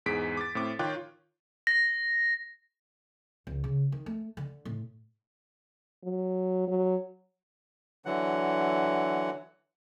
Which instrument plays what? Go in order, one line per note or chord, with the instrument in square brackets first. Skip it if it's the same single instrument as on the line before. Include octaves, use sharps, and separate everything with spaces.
[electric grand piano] E2 G#2 G#4 B6 D7
D6 A6
A2 C4 D6
D#3 F4 C#5 G5 D6 F#6
[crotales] A#6
[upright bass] C#2
C#3
D#3
A3
D3
A2
[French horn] F#3
F#3
[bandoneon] D3 E3 F#3 F#5